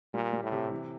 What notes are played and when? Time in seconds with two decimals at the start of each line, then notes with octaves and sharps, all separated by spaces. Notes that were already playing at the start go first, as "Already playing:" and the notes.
0.14 A#2 G3
0.33 G3
0.43 A2
0.52 C3
0.71 E3